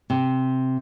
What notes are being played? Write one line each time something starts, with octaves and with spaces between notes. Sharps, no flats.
C3